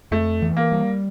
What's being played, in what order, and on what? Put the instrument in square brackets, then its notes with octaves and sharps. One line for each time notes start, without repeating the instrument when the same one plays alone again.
[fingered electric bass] F2 [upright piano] A3
[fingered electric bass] E3
[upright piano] A#3
[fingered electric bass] G3